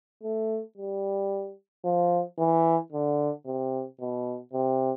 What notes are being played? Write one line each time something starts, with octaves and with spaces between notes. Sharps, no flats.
A3
G3
F3
E3
D3
C3
B2
C3